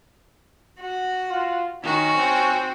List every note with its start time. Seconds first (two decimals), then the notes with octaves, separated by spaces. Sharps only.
0.81 F#4
1.30 F4
1.84 D#3 C#4 F#4
2.17 C4